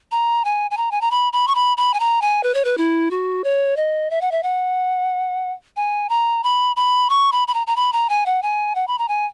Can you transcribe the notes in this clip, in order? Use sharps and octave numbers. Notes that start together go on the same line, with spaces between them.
A#5
G#5
G#5
A#5
G#5
A#5
B5
B5
C#6
B5
B5
G#5
A#5
G#5
B4
C#5
B4
E4
F#4
C#5
D#5
E5
F#5
E5
F#5
G#5
A#5
B5
B5
C#6
B5
B5
A#5
A#5
B5
A#5
G#5
F#5
G#5
F#5
B5
A#5
G#5